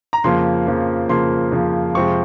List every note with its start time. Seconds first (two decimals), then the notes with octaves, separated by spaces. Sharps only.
0.13 A#5
0.24 F2 C#3 F3 A#3 C6
0.67 F2 C#3 F3 A#3
1.09 F2 C#3 F3 A#3 C6
1.52 F2 C#3 F3 A#3
1.94 F2 C3 F3 G#3 C4 C#6